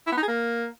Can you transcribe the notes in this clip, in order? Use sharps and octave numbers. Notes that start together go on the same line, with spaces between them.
E4
B3
D#4
G#4
A#3